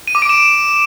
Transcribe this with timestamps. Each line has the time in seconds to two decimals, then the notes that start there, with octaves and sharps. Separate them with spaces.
0.08 D#7
0.15 D6
0.22 D7
0.29 E7